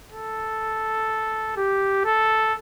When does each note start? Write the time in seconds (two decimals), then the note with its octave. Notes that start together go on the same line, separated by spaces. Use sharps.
0.12 A4
1.57 G4
2.05 A4